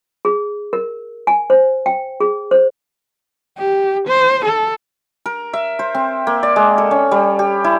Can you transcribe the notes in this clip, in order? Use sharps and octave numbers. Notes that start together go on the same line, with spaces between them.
G#4
A#4
G#5
C5
G5
G#4
C5
G4
C5
A4
A#4
E5
C5
C4
A#3
D5
G#3
A4
C#4
G3
G4
E4